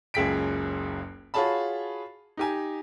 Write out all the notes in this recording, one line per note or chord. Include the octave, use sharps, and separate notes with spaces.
F#1 C#2 G#4 G5 B6 D7
F4 F#4 G#4 C#5 A5 B5
D#4 G4 G#5